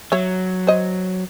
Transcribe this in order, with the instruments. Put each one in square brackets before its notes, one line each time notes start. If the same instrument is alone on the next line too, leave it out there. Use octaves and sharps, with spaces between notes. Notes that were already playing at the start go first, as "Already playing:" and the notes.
[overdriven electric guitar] F#3 [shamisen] C#5 E5
[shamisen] C5 D#5